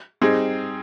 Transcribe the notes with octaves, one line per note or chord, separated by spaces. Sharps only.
G3 C4 D#4 G#4